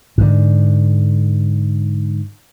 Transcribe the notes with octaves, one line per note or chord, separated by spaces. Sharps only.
G#2 D3